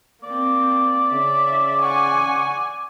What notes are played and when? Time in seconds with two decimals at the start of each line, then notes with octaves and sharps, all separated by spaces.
0.24 A#3 C4 D5
1.13 C#3 E5
1.82 F#5 G#5 C#6